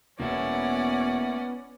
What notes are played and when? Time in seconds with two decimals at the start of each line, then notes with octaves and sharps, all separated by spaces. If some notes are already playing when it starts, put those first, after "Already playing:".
0.20 E1 A#3 B3 C#4 E4 D5 F#5